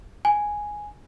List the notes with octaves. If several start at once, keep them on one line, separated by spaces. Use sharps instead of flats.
G#5